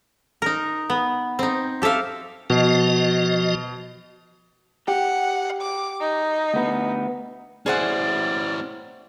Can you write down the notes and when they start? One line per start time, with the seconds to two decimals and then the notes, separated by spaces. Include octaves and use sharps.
0.42 D#4 A#4
0.90 B3
1.39 C4 D#4
1.82 G4 A4 C5 E5 F5
2.50 B2 F3 F#4 D#5
4.88 G4 F#5
5.62 D6
6.01 D#4
6.54 D2 B3
7.66 C#4 E4 G#4 C5 D5 F#5